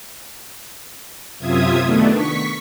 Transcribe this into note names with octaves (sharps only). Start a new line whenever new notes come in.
F#2 C3 F4 E5 D#6 G#6
D#3 A3 B3 D4
C#6 B6